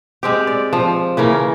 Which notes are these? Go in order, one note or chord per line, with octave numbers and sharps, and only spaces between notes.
G#3 C4 G4
D5
F3
C#3 E3 A#3 C#4